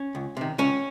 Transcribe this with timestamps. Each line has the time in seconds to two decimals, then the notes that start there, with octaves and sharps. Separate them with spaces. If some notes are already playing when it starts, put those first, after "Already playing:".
Already playing: C#4
0.15 C#2
0.37 C3 D#3
0.58 C#2 C#4